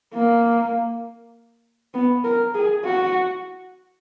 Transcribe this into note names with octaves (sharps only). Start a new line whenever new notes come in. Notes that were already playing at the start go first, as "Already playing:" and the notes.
A#3
B3
A#4
G#4
F#4